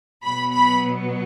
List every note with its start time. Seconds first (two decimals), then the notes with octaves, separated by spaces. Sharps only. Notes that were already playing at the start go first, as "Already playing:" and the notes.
0.23 B2 F#3 B3 B5
0.52 B5